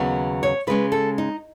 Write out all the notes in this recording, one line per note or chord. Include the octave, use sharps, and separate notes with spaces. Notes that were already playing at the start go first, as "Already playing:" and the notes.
Already playing: D#2 C#3 F#3 B3
C#5
C#3 G#3 C#4 B4
A4
D#4